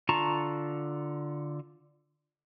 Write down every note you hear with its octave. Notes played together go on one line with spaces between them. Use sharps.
D3 F4 A5 A#5 C#6